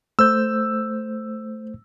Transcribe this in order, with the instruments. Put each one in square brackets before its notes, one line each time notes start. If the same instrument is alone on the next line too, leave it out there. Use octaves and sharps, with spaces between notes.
[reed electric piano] A3 C5 G6 [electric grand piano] E6